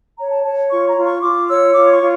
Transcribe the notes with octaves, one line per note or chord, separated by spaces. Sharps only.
C#5 A#5
A5
C#5 A5
F4 C#6
A#5
F4
C#6
F4 D6
C#5 E6
F4 D6
C#6
F4